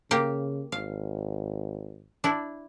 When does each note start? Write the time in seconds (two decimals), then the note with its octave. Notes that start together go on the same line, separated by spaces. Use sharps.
0.11 C#3 A#3 G4
0.72 G#1 F5
2.24 D4 E4